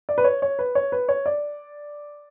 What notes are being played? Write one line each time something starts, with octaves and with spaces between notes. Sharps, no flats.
D5
B4
C#5
C#5
B4
C#5
B4
C#5
D5